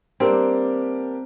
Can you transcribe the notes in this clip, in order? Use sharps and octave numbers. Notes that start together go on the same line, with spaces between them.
G3 A#3 C4 D4 G4 A#4